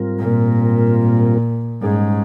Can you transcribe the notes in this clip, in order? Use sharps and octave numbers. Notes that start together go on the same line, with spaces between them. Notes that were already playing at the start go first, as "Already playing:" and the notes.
Already playing: G#2 G3 C4 F4 A#4
A#2
G#2 G3 C#4 G#4